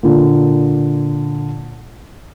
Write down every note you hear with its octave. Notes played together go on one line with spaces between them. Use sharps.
A#2 D3